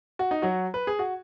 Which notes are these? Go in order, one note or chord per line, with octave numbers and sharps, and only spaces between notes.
F#4
D#4
F#3 F#4
B4
G#4
F#4